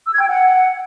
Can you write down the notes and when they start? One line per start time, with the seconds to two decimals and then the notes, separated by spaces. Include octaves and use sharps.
0.07 E6
0.14 G#6
0.21 G5
0.29 F#5